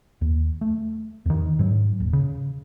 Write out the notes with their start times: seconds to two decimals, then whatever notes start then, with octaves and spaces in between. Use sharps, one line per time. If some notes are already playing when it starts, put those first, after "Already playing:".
0.21 D#2
0.61 A3
1.26 E2 D#3
1.59 G#2 F#3
2.00 D#1
2.13 C#3